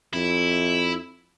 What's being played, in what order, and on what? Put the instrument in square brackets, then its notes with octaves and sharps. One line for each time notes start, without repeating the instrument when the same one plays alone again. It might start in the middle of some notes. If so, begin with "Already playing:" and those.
[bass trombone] F2 [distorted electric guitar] E4